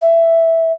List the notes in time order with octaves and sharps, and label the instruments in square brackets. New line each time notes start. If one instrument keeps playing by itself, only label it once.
[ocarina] E5